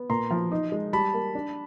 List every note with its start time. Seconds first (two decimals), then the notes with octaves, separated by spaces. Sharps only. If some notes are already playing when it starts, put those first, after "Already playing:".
Already playing: B3
0.09 A#2 A#5 C6
0.31 F3
0.51 D#4
0.72 G#3
0.93 G3 A5 B5
1.14 A#3
1.35 D4